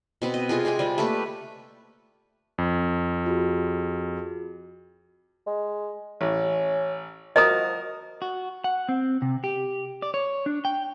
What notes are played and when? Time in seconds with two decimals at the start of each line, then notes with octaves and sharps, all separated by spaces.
0.22 B2 C4 B4
0.34 D#5
0.49 C3 F4 G#4 A#4
0.65 G#3 C4 G4 G#5
0.79 G3 C4 F4
0.98 A3 A#3 G4 B4
2.58 F2
3.26 F4 F#4 G#4
5.47 G#3
6.21 A1 C#4
7.36 F3 F#4 A#4 D#5 A#5 D#6
8.22 F#4
8.64 F#5
8.89 C4
9.22 C3
9.44 G4
10.02 D5
10.14 C#5
10.46 D4
10.65 G5